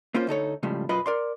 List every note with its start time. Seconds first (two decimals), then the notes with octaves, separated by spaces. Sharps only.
0.14 A#3 C#4 F4 C5
0.27 D2 D#4 A4 C#5
0.63 A2 C#3 F3 G3 G#3
0.89 B1 F#2 F4 B4 D#5 B5
1.06 A#4 D5 C6